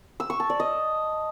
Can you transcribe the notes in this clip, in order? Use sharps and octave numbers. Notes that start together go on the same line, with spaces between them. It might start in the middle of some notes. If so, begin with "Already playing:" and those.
E6
C#6
A5
D5
D#5